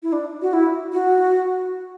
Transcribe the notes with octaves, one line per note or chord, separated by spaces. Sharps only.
E4
D4
F#4
E4
F#4